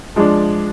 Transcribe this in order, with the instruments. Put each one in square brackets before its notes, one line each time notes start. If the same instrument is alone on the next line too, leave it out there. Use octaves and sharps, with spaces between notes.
[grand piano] F3 G#3 D4